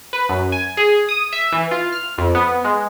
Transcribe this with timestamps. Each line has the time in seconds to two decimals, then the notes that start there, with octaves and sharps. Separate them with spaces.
0.13 B4
0.29 F#2
0.52 G#5
0.77 G#4
1.09 D#6
1.33 E5
1.53 E3
1.71 F4
1.93 F6
2.18 F2
2.35 B3
2.65 G#3